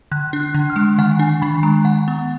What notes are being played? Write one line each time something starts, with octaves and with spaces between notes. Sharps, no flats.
D3 F#6
D4
F#6
D3
F6
G#3
D#3 F#5
D4 G#5
D#3 B5
G#3 A#5
D#3 F#5
B3